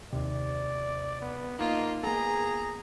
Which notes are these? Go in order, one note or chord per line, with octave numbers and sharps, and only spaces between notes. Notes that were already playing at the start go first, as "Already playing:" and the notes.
D#2 C3 D5
B3
A#3 D#4 F4 D#5
A#3 B3 G#4 A#5